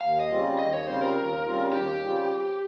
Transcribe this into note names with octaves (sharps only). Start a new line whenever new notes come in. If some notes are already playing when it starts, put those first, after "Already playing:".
D#2 F5
D#5
C#3 G3 C4 F4
D#2 D#5
C#5
C#3 G3 C4 F4 C5
A#4
D#2
C#3 G3 C4 F4
D#2 G4
C#3 G3 C4 F4